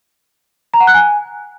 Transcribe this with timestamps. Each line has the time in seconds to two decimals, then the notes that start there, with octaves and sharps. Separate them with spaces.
0.74 A#5
0.80 F#5
0.87 F#6
0.94 G#5